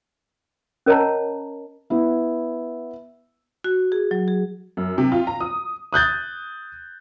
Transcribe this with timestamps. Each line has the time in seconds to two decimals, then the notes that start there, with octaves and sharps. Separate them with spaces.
0.86 C#4 A#4 C#5 D#5 A5 A#5
1.90 B3 E4
3.64 F#4
3.92 G#4
4.11 F#3
4.28 G#4
4.77 F#2
4.98 C3
5.12 F4
5.27 A#5
5.40 D#6
5.93 D#6 F#6 G6 A6